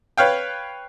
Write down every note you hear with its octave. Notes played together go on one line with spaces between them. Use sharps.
B4 C#5 F5 G5